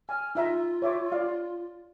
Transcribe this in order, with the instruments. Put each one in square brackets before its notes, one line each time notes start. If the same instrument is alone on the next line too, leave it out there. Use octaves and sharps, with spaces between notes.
[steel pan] G#5 [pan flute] F6
[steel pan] D#4 E5 A#5 [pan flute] F4
[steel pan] C#5 E5 D6
D5 F5